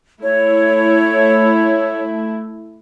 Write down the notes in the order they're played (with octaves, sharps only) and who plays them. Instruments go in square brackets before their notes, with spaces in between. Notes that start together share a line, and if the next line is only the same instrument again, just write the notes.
[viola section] A3 E4 [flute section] C#5